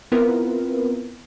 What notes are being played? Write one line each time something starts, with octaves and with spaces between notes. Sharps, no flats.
B3 C4 E4 F4 A#4 B4